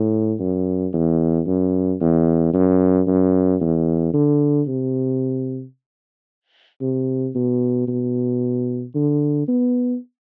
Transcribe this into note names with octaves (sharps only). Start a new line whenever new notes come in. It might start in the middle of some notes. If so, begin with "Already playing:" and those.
Already playing: A2
F#2
E2
F#2
E2
F#2
F#2
E2
D3
C3
C3
B2
B2
D3
B3